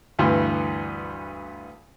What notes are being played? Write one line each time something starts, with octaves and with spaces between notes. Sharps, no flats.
D2 G2 E3